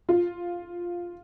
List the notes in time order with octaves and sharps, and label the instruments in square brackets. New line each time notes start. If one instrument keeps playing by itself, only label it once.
[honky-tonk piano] F4